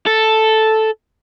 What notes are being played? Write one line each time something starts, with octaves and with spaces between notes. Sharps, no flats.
A4